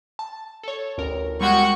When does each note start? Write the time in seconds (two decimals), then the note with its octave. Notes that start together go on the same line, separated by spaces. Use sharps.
0.19 A5
0.63 A4 C#5
0.98 A1 D2 A#4
1.41 G3 G#3 F#4 G5 C#6